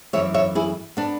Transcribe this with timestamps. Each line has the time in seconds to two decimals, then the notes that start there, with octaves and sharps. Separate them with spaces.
0.13 F#2 E3 C#5 E5
0.34 C#5 E5
0.55 E4 G#4
0.97 B3 D4